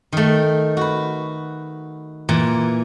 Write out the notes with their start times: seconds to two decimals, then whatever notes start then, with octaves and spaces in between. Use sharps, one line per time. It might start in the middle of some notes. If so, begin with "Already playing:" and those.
0.12 D#3 A3
0.77 F#4 B4
2.29 A#2 E3